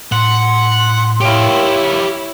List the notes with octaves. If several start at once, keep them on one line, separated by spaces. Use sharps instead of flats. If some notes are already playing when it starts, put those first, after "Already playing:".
A2 F#5 C6
E4 G4 C#5 F5